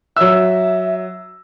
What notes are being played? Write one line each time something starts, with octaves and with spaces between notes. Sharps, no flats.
F#3 E5 E6